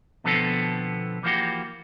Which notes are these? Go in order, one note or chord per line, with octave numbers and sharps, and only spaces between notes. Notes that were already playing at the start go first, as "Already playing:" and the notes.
B2 D3 F3 B3 C4 A4
E3 F3 A#3 D4 F#4 G4